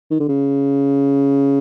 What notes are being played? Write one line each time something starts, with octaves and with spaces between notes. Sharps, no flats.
D#3
D3
C#3